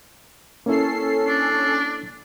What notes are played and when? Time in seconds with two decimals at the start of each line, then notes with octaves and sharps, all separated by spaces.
0.66 A#3 C#4 E4 A4 C7
1.27 D4